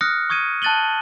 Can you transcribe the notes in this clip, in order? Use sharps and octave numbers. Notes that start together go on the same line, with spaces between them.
D#6 F6 F#6 A#6 C#7
C#6 D#6 G#6 C#7 D#7
A5 F#6 A6 D#7 F#7 G7